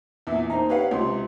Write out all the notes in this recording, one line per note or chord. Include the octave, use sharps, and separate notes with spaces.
E2 A#2 E4 E5
A#3 C4 D#4 A#5
G4 B4 C#5 F5 F#5
C#2 C3 C6